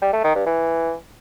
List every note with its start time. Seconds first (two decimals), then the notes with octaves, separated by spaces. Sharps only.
0.02 G3
0.13 A3
0.24 D#3
0.35 G2
0.46 E3